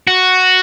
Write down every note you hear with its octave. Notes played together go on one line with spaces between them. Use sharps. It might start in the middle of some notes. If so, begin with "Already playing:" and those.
F#4